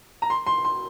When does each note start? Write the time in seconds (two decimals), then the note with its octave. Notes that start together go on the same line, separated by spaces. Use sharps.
0.22 A#5
0.30 C6
0.47 C6
0.65 C6